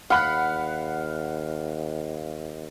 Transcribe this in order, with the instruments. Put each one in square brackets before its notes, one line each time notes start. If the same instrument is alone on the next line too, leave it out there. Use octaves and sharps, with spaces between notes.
[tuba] D#2 [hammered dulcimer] F5 [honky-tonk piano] F#5 B5 F#6